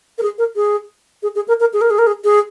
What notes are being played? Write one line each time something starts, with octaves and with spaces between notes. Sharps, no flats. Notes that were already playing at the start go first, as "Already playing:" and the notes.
A#4
G#4
A#4
G#4
G#4
G#4
A#4
A#4
G#4
A#4
G#4
A#4
G#4
G#4